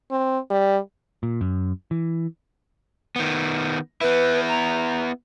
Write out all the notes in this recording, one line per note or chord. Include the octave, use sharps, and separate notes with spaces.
C4
G3
A#2
F#2
E3
D#3 B3
B3 E4 B4
A#5